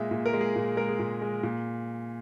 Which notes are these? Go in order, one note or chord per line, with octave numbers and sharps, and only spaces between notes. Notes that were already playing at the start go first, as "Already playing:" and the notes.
Already playing: A#2 G#3 E5
A#2
A#4
G#3
G#4
A#2
G#3 A#4
G#4
A#2
G#3
A#2